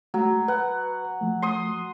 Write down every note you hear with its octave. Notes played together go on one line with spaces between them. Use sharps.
F#3 G#3 A3
B4 F#5
F3 A3
C6 D#6